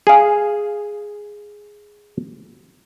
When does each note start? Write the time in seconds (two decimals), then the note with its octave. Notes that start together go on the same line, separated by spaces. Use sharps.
0.07 G#4 F5